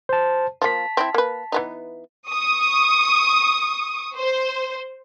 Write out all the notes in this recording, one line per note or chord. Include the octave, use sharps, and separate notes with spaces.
C5 A5
F3 A#3 A5 B6
C4 D#4 E4
A#3 B4
E3 B3 D#4
C#6 D#6
C5